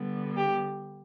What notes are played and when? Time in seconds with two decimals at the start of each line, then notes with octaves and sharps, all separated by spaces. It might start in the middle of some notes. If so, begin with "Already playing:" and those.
Already playing: D3 G3 B3
0.36 G4